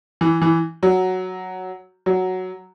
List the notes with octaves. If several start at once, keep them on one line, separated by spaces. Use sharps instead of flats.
E3
E3
F#3
F#3